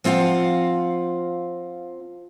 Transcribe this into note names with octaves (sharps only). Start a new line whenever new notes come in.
F3 C4 F4 F5 F#5